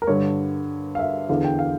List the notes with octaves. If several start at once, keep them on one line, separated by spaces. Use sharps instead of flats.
A#4
G2 D3 C#5
F5
E5
E2 D3 F5
G5
F5